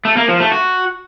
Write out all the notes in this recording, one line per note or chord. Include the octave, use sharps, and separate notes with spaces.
A3
A#3
F3
A3
F#4